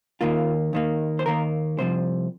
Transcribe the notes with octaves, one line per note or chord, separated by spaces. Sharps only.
D#2 D#3 A#3 F4
D#2 D#3 A#3
C5
D#2 D#3 A#3 A#4
C2 C3 F3 C5